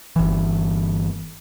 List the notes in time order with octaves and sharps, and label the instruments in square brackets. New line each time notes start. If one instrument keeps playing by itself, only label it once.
[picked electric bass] G1 E3